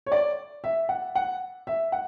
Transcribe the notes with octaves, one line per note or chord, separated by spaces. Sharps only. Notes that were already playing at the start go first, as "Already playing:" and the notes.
C#5
D5
E5
F#5
F#5
E5
F#5